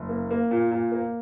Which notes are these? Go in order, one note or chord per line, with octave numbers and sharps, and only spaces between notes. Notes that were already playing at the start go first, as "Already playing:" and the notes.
Already playing: F#1
A#3
A#3
A#2
A#2
A#3